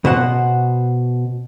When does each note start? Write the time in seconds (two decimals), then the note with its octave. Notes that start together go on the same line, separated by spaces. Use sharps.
0.05 B2 C5 F#5